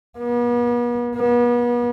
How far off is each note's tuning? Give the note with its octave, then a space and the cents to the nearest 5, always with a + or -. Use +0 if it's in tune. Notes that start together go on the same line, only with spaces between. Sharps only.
B3 -40
B3 -40